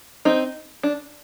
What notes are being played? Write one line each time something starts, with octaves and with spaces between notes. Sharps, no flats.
C4 D#4
D4